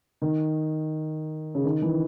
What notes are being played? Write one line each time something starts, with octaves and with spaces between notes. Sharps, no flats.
D#3
C#3
D#3
E3